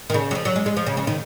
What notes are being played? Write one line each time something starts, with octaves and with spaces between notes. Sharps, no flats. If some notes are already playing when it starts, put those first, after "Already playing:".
D#3
C#3
F#3
F3
F#3
G#3
G#3
F3
C#3
C#3
D#3